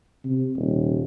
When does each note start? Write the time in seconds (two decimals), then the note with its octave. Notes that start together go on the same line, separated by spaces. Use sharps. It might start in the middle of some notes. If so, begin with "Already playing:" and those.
0.25 C3
0.56 D#1